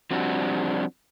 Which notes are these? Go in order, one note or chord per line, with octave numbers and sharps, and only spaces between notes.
F3 G3 C4 D4 F#4